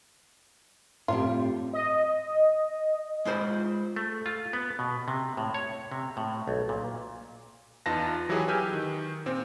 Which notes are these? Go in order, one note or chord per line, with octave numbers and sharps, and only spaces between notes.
A2 C3 G3 F4
D#5
G#3 F4 C5 B5
A3
F4
B3
B2
C3
A2
C#5
C3
A2
B1
A#2
E2 D#4 F4 B4 A5 A#6
E3 F#3 E4 G4 G#4
G4 B4 G#5 E6 F6 G6
D#3
A#2 C4